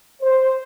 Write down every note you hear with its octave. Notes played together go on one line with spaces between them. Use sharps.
C5